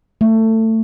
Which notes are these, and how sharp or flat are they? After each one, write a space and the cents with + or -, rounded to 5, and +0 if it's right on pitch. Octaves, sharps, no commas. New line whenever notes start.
A3 +20